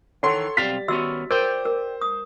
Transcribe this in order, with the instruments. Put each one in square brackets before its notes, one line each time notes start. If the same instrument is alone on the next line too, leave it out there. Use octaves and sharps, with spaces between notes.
[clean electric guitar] D#3 E3 [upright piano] A4 C#5 C6 [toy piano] F#5
[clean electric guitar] B1 C4 F5 [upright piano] G3 A6 B6
[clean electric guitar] D#3 B3 C#4 [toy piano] F#4 E5 E6
[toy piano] A#4 [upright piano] C5 [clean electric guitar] D5 G5
[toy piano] A#4
D#6